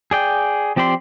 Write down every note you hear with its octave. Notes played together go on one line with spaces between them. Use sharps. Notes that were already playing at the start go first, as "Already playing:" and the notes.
G#4 D5 G5
F3 C4 G4 D5 C6